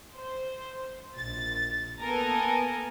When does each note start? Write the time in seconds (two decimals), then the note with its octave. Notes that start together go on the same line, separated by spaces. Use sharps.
0.15 C5
1.17 A#1 A6
2.01 A#3 B3 A4 A#4 G#5 A#5